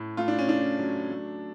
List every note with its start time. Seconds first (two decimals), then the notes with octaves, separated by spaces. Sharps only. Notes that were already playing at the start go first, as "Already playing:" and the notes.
Already playing: A2
0.17 A3 F4
0.28 D4
0.39 C#4
0.48 C#3 D4
0.79 F#3
1.10 A3